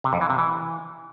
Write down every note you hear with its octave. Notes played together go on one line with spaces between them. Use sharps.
C3
F2
E3
C3
E3